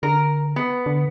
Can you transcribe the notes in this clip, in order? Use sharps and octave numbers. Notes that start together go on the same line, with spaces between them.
D3 A#4
B3
D3